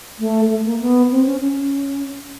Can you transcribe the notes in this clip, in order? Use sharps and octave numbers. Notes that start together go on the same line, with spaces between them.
A3
A3
A#3
B3
C4
C#4
C#4